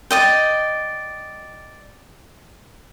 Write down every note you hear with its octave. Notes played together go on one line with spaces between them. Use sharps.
D5 D#5 G5